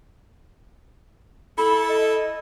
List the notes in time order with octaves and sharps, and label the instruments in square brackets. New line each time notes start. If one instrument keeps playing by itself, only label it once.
[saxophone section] E4 A4 [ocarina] B5
[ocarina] D#5